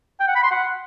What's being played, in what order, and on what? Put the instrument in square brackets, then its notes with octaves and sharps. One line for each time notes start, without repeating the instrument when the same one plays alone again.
[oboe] G5
F#5
B5
C6
F#5